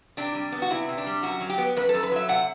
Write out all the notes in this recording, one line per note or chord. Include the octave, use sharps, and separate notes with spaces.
C3 D4
G3
B3
F#4
C3 E4
C3
D4
G3
F#2 F#4
F#3
G4
B3
F#2 B4
A4
F#2
B4
F#3 E5
C3 F#5